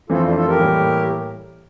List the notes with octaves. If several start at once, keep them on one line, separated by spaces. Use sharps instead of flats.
F2 E3 A3 C4 F4 A4
D4 F4
F4 A4
G4 A#4
A2 E3 G3 A#3